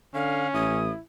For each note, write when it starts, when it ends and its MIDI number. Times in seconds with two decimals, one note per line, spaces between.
0.15 0.47 50
0.15 0.83 61
0.15 0.48 77
0.54 0.90 33
0.54 1.00 64
0.54 0.91 87